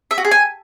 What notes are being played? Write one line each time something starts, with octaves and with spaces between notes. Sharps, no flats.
E5
F#4
G#4
G#5